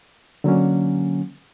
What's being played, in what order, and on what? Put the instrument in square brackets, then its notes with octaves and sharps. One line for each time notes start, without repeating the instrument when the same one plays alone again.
[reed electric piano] D3 F#3 A#3 C#4